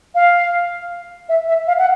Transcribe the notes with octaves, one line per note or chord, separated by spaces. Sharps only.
F5
E5
E5
F5
F#5